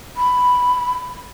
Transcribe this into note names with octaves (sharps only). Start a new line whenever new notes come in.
B5